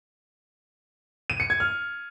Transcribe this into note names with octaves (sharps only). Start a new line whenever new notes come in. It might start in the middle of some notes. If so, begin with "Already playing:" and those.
D#7
C#7
G#6
F6